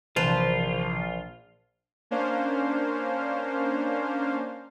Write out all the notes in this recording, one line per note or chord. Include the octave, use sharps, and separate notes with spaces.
A#1 C3 E3 F4 B4 C5 A5
A#3 C#4 D4 C5 F5